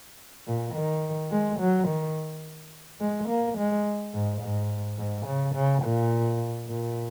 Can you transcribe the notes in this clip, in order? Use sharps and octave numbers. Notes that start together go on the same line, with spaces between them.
A#2
D#3
G#3
F#3
D#3
G#3
A#3
G#3
G#2
G#2
G#2
C#3
C#3
A#2
A#2